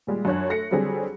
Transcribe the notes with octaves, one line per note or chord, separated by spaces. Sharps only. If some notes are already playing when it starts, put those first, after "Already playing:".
A#2 G3 G#3
F#2 D4 C#5 F#6
A3 A#6 C#7
D3 F#3 G3 C4 G#4